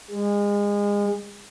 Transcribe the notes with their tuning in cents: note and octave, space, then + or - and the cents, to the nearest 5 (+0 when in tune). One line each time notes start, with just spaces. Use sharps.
G#3 -30